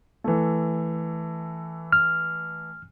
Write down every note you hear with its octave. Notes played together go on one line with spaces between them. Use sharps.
E3 A3
F6